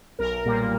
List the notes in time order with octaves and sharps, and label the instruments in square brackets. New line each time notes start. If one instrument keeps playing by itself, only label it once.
[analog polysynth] B1 A#4
A#2 G3 A#3